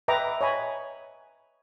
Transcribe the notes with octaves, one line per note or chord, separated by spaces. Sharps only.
B4 D#5 E5 G5 A#5 D6
C#5 D#5 G#5 B5